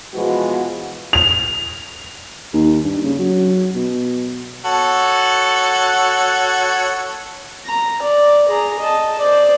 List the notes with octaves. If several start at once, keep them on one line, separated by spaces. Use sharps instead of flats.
B2 E3 F3 G#3 B3 F#4
F7
D#2
G2
C#3
F#3
B2
F#4 A4 C#5
A#5
D5
G#4 A#5
D#5 A5
C5 D5